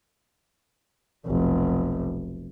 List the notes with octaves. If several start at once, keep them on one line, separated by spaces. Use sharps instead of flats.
F1 B1